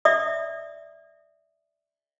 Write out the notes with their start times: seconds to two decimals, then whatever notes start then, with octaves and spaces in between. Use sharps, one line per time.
0.05 D5 E5 D#6